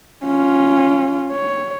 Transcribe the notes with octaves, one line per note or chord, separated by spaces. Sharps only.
C#4 F4
C#5